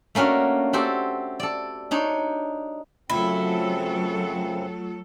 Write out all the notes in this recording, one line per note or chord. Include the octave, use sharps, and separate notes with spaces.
A3 A#3 C#4 D4 F#4
C4 F#4 G4 A4
A4 D5
D4 D#4 C#5
F#2 C#3 F#3 A3 C4 E4 F4 A4